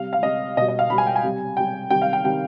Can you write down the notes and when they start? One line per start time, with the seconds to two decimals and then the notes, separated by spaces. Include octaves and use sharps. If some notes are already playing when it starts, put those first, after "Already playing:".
Already playing: C3 G3 F5
0.13 F5
0.23 C3 G3 D#5
0.57 B2 G3 D#5
0.68 D#5
0.79 F5
0.90 B2 G3 B5
0.98 G#5
1.07 G5
1.16 G#5
1.23 C3 G3
1.57 C3 G3 G5
1.90 C3 D#3 G3 G5
2.02 F5
2.13 G5
2.24 C3 D#3 G3 G5